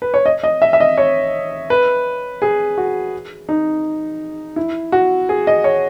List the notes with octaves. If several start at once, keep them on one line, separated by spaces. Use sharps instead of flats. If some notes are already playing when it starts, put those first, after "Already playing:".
B4
C#5
D#5
D#5
E5
E5
D#5
C#5
B4
G#4
F#4
D#4
E4
F#4
G#4
D#5
C#5